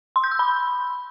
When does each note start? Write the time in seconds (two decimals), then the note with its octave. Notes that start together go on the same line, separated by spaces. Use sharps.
0.16 C6
0.24 G6
0.31 E6
0.39 B5